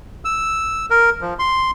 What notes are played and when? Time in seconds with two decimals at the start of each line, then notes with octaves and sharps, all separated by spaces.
0.25 E6
0.90 A#4
1.21 F3
1.39 C6